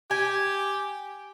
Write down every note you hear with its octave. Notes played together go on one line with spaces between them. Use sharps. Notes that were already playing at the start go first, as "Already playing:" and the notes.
G4 G#5